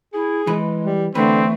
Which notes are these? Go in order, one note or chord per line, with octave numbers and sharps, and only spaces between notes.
E4 G#4
E3 G#3 B4
G3
E2 D3 A3 C4 B4